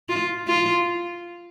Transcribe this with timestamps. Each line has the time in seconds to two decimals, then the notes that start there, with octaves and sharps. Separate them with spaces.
0.09 F4
0.47 F4